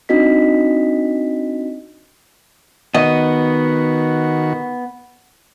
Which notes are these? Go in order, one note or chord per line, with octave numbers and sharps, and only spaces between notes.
C4 D4 D#4 F#4 D#5 B6
D#3 B3 F#4 D#5